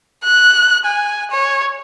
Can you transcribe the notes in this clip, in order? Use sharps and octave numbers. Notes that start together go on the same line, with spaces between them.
F#6
G#5
C#5